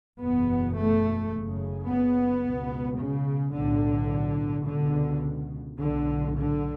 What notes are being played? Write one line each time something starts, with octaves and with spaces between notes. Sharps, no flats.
F#1 E2 B2 B3
A3
F#1 F#2 C#3
B3
C#2 B2
C#3
B1 A2 D3
C#2 B2 D3
B1 A2 D3
D3